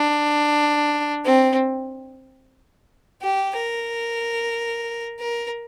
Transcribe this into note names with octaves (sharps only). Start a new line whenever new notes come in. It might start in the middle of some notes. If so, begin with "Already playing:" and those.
Already playing: D4
C4
G4
A#4
A#4